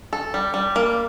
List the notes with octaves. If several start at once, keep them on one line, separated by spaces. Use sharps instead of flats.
A4
G3
G3
A#3